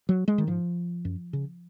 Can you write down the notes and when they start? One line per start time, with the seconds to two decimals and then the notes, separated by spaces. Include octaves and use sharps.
0.09 F#3
0.28 G#3
0.38 D#3
0.47 G#2 F3
1.05 F#2
1.33 C#3